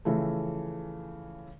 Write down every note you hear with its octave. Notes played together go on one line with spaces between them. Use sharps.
C#3 E3 F3 A3